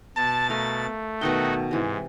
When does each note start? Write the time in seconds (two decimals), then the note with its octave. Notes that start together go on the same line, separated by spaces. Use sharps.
0.16 B2 A5 A6
0.50 A3 A#4 F5 G#5
1.21 B2 D#3 D#4 F#4 G5
1.71 G#2 C3 E3